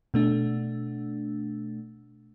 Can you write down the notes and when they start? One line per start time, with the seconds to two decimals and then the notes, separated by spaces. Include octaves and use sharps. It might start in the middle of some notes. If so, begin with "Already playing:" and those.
0.14 B2 A3 D4